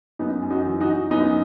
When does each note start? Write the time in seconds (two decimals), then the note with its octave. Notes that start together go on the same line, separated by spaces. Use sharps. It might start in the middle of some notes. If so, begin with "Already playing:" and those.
0.19 F#2 B3 D#4
0.42 F#2
0.50 D#4 F#4
0.65 E3
0.81 D#4 F#4
0.88 E3
1.11 F#2 B3 D#4